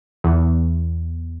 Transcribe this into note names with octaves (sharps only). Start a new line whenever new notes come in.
E2